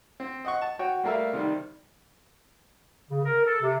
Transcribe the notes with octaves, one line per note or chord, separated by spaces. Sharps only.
C4
D#5 F#5 C#6
A5
F#4 C#5 G5
G3 A3 A#3 A#4 E5 F5
C3 D#3 G3
C#3
A#4
A4
C3